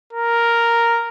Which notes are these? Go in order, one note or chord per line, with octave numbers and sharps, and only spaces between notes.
A#4